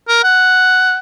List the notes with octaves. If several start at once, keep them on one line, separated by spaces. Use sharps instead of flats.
A#4
F#5